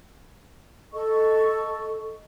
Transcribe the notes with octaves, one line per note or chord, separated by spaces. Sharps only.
A4 D#5 C#6